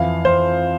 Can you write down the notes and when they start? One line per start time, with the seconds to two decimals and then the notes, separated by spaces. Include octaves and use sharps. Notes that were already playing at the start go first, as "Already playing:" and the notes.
Already playing: F2 E3 F5
0.25 C5